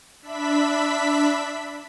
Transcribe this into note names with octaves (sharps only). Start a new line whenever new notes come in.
D4 E5 B5 B6